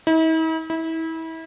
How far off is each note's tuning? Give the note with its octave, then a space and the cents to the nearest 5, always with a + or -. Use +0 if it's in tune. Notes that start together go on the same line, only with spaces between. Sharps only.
E4 -45
E4 -30